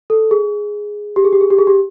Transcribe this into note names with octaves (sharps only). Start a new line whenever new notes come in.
A4
G#4
G4
G#4
G4
G#4
G4
G#4
G4